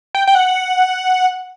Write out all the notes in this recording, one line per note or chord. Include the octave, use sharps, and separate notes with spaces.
G5
G5
F#5